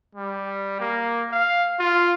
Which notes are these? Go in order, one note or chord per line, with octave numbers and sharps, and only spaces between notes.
G3
A#3
F5
F4